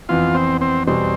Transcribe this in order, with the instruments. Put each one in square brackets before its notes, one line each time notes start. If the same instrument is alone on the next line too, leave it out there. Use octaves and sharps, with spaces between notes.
[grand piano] F2 E3 B3 [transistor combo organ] F4
[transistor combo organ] C4
C4
[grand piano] E2 B2 G3 [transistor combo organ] C4